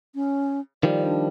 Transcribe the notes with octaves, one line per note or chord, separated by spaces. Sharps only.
C#4
D#3 F3 G3 D5
D4